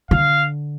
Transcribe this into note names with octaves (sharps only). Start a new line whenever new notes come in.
D3 F5